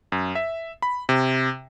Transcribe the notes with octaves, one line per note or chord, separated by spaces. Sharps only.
F#2
E5
B5
C3